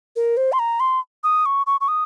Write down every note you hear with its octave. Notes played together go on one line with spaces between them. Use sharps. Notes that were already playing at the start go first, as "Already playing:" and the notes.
A#4
C5
C6
A#5
C6
D#6
C#6
C#6
C#6
D#6